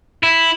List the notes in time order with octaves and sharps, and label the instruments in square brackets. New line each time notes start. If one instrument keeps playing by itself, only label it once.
[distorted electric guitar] E4